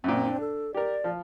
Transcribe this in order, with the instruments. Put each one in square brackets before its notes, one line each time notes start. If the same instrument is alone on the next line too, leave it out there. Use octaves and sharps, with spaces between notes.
[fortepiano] F#2 A#2 [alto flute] C4
[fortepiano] D4
[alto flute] A4
[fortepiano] G4 A#4 [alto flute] D5
[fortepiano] F3